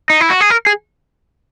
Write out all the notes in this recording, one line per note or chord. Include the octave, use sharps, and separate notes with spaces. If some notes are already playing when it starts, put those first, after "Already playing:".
D#4
E4
F#4
G#4
A#4
G#4